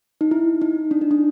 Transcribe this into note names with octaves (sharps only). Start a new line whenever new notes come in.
D#4
E4
D#4
D4
D#4
D4